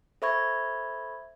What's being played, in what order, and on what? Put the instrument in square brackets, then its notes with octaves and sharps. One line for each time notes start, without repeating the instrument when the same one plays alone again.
[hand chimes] A4 C5 E5 B5 C#6 G#6